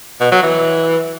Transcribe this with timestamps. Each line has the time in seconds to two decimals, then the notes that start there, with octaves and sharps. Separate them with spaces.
0.21 B2
0.32 F#3
0.43 E3